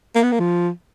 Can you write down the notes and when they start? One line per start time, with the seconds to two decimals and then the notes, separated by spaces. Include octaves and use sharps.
0.15 A#3
0.23 B3
0.32 A#3
0.39 F3